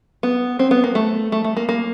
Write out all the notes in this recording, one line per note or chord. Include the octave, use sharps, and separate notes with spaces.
B3
C4
B3
A#3
A3
A3
A3
A#3
A#3